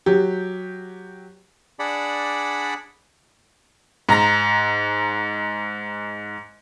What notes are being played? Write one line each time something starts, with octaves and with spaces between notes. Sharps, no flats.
F#3 G4
D4 G#4 D5 F#5 B5
G#2 A#5 A#6